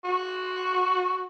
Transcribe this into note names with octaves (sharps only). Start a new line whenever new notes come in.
F#4